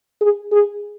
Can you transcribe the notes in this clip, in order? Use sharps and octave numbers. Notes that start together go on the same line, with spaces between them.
G#4
G#4